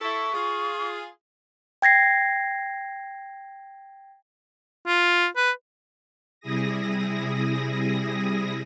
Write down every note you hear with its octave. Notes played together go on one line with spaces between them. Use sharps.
E4 A4 C#6
F4 G#4
G5 G#6 A#6 C7
F4
B4
C3 G3 E4 G#4 D#6 A#6